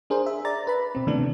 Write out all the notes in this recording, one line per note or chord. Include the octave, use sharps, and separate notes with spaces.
D4 G#4 A#4 C5
E5
D5 A#5 A6
B4 B5
B2 C4
C3 D#3 E3 A3 B3 D4